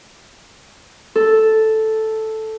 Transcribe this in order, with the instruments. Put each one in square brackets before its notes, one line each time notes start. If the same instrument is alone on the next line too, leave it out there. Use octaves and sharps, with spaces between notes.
[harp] A4